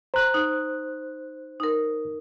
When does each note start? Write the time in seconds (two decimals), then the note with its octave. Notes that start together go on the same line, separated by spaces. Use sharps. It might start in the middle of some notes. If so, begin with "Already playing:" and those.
0.14 C5 A#5 F#6
0.34 D#4
1.60 D#4 A#4